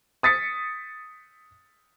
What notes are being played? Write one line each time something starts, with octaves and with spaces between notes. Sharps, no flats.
D#6 A6 B6 C#7